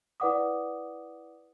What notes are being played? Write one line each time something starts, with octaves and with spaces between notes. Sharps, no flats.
E4 B4 D5 F#5 D6 D#6